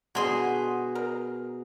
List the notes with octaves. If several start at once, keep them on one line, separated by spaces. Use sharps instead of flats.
B2 D3 G#4 C6
A#4